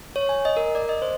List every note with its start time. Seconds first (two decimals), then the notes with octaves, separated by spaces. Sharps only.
0.16 C#5
0.29 G#5
0.45 D#5
0.57 A#4
0.75 D5
0.89 D#5
1.02 C5